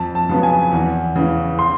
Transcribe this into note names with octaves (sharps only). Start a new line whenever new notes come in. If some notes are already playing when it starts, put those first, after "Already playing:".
Already playing: F2 A5
A5
C#3 F#3 B3
G#5
E2
C#3 E3
C6